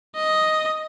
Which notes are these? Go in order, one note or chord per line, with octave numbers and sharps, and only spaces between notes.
D#5